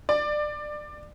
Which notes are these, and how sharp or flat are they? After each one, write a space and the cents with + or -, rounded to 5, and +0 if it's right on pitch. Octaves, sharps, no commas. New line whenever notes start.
D5 +25